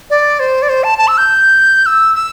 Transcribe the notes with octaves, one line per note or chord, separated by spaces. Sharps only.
D5
C5
D5
C5
A5
A5
E6
G6
E6
E6